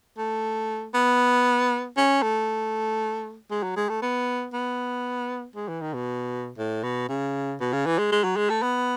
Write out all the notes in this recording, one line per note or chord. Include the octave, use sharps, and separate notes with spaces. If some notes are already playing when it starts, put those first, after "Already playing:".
A3
B3
C#4
A3
G#3
F#3
G#3
A3
B3
B3
G#3
E3
D#3
B2
A2
B2
C#3
B2
C#3
E3
G#3
G#3
F#3
G#3
A3
B3